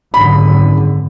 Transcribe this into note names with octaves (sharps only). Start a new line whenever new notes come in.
G#1 F#2 D3 B5